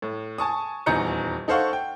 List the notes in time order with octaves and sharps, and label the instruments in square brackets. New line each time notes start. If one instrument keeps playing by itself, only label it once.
[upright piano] A2
G#5 A5 C#6 D#6
D#1 E2 D#4 A#5 G6 C#7
D#4 A4 C5 F5 F#5 C#6
G5